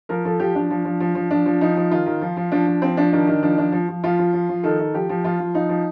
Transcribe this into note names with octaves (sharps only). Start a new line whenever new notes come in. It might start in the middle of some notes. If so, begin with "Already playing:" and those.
F3 A#4
F3 A4
F3 G4
F3 D4
F3
F3
F3
F3
F3 D4
F3
F3 D#4
F3
D#3 F4
D#3
F3
F3
F3 D4
F3
F3 C4
F3 D4
D#3 D4
D#3
F3 D4
F3 D4
F3
F3
F3 F4
F3
F3
F3
D#3 A4
D#3
F3 G4
F3
F3 F4
F3
F3 D#4
F3